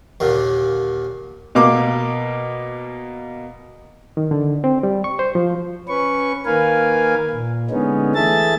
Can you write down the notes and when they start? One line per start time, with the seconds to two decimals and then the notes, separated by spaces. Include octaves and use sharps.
0.20 D#2 A#2 D3
1.55 B2 A#3 D6
4.17 D#3
4.31 D3
4.64 C4
4.83 G3
5.04 C#6
5.19 C5
5.35 F3
5.88 C#4 B4 C#6
6.46 D#3 A#3 A#4 B4 F5 G#5
7.30 A#2
7.70 D3 G#3 B3 C#4 D#4
8.15 E3 A3 G#4 E5 A5 A6